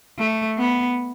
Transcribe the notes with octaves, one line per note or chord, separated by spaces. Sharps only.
A3
B3